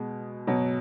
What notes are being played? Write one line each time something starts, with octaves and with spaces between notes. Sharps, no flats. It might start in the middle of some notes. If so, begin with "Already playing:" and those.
Already playing: B2 G#3
B2 F#3